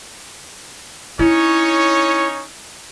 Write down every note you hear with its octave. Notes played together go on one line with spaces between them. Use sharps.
C#4 D#4 E4 C#5